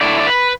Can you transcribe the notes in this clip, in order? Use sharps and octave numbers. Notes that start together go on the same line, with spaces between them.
D3 A3 E4 D5
D5
B4